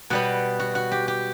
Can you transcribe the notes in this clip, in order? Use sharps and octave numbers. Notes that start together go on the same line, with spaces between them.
B2 G3 B3 F#4
F#4
F#4
G4
G4